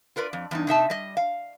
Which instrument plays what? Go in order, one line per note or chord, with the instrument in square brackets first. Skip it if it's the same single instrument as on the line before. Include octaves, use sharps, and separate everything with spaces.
[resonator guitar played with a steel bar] F4 A#4 B4 D5
F2
E2 G2 D#4
C3 D#4 E5 A5
G3 D#5
F5